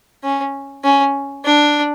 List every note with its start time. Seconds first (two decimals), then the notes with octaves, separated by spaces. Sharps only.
0.23 C#4
0.84 C#4
1.44 D4